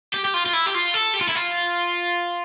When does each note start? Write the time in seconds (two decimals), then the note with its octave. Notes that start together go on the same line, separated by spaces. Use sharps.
0.14 G4
0.25 G4
0.34 F4
0.46 F4
0.53 E4
0.66 G4
0.75 F4
0.94 A4
1.14 G4
1.21 F4
1.29 E4
1.35 F4